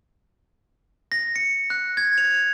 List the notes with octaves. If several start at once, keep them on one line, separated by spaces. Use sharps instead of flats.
A#6
C#7
F#6
G#6
F7